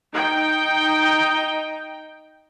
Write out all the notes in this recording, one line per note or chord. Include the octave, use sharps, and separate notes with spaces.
D#4 G5